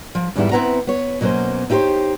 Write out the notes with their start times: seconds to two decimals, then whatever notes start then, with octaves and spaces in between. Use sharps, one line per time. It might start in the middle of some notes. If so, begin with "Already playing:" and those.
0.15 F3
0.36 E2 G#2 D#3 G3 B3 E4
0.51 B3 C4 E4 B4 F#5 A#5
0.87 B3 C#5
1.21 B2 F#3 A#3 C4 C#4 C5
1.70 D#4 E4 G4 G#4 C5 C#5